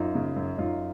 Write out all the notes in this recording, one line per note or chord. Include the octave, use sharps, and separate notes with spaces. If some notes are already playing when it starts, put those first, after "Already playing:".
Already playing: F#2 D#4 F4
C#3
F#2
F#2 D#4 F4